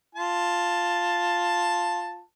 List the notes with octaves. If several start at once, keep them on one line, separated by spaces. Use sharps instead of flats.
F4 A5